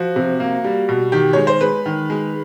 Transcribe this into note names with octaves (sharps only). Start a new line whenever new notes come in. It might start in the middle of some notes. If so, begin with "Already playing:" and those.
Already playing: F3 F#4
C3
A#3
G3
B2
D#3 G4
G#3 C#5
C5
G#3 B4
D#3
G#3